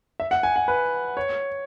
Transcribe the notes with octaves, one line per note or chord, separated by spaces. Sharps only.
E5
F#5
G#5
F#5
B4
C#5